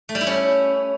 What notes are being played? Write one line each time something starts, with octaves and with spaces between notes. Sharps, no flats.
A3
G3
E4
C#4